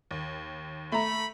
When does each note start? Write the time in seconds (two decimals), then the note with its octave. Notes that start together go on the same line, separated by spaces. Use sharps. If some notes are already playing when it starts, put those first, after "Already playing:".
0.11 D#2
0.92 A3 A#5 B5